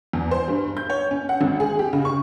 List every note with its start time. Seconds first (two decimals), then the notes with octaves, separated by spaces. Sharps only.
0.13 E2
0.31 C5
0.48 G2
0.77 G6
0.90 C#5
1.11 C#4
1.29 F#5
1.41 G#1
1.60 G#4
1.79 G4
1.93 C#3
2.05 C#6